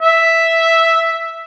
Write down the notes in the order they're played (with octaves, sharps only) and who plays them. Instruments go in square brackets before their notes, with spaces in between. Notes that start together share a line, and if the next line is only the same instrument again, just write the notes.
[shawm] E5